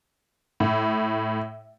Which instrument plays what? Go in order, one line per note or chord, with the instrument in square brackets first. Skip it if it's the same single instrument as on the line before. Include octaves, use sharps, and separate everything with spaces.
[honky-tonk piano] A2